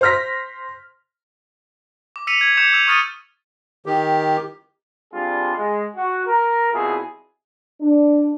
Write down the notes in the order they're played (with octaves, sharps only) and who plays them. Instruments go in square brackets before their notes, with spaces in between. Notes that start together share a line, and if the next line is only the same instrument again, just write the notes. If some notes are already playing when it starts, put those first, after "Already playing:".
[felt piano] C5 C6 F6 A#6 B6
[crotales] D6
E6 B6 C#7 D#7 F7
G#6
D6 G6 C#7 E7 F7
D6 E6 F7
C#6 D#6 F6 A6 C#7 D#7
[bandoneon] D#3 G4
[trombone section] G3 C4 D4 F4 G4 G#4
G#3
F#4
A#4
C2 B2 E4 F4 G#4
[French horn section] D4